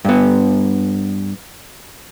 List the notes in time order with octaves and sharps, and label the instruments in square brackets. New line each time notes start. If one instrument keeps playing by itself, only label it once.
[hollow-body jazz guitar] G2 B3